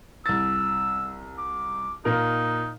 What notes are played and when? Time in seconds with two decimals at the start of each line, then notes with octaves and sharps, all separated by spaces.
0.26 C2 E6 A6
1.38 D6
2.05 A#2 D#4 A#4